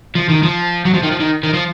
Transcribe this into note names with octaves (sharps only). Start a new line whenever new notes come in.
F3
D#3
F3
F#3
F3
D#3
F3
D#3
D#3
F3